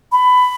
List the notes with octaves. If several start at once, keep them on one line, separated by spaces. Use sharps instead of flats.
B5